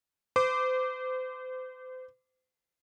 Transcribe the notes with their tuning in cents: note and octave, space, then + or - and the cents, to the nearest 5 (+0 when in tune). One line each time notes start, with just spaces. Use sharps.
C5 -35 D6 +0